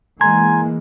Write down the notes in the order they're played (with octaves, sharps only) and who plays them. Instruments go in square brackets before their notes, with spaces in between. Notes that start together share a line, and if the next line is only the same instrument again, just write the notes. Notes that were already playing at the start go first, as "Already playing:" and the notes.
[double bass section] E3 G#3 A#3 [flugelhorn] G#5 [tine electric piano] A#5 C6 G#6